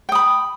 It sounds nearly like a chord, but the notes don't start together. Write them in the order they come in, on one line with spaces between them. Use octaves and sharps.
G5 D#6 B5